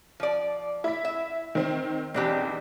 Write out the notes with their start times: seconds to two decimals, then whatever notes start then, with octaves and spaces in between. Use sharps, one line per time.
0.20 F3 D5
0.84 E4 B6
1.05 E5
1.55 D#3 C4
2.14 B1 E2 C4 D4 G4